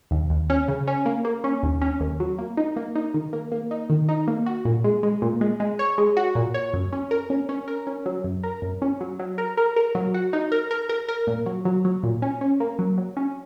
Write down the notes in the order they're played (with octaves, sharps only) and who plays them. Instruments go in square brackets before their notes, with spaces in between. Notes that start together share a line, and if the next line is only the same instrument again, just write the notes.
[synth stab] D#2
D#2
C#4
C#3
C#4
A#3
A#3
C#4
D#2
C#4
D#2
F#3
A#3
D#4
A#3
D#4
D#3
A#3
A#3
D#4
D#3
D#4
A#3
F#4
A#2
G#3
G#3
A#2
G#3
G#3
C#5
G#3
F#4
A#2
C#5
F#2
C#4
A#4
C#4
C#4
A#4
C#4
F#3
F#2
A#4
F#2
C#4
F#3
F#3
A#4
A#4
A#4
F#3
F#4
D#4
A#4
A#4
A#4
A#4
A#2
F#3
F#3
F#3
A#2
C#4
C#4
A#3
F#3
F#3
C#4